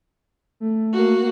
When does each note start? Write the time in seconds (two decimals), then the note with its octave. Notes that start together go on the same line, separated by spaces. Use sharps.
0.60 A3
0.94 A#3 F#4